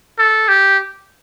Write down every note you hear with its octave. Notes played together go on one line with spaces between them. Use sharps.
A4
G4